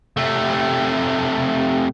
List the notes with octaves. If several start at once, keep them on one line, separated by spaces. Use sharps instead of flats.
C3 A3